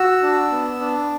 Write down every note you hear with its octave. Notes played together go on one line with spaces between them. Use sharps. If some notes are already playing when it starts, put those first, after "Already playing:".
Already playing: F#4 E6
D4
B3
D4